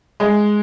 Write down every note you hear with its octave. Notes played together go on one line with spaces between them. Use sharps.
G#3